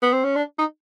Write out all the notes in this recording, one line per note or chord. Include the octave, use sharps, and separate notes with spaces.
B3
C4
C#4
D4
D#4